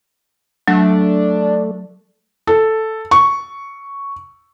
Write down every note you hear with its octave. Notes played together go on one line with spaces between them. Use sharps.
F#3 A3 D4
A4
C#6